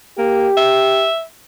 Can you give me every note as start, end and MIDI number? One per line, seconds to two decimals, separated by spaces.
0.19 0.48 58
0.19 1.08 67
0.57 1.23 76